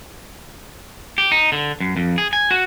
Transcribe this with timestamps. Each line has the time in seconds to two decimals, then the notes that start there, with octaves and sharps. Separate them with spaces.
1.18 G4
1.32 D#4
1.52 D3
1.80 F#2
1.97 F2
2.18 G#4
2.33 G#5
2.51 F#4